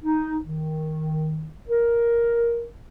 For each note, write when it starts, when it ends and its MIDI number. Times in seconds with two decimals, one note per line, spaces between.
0.04 0.37 63
0.45 1.48 51
1.69 2.65 70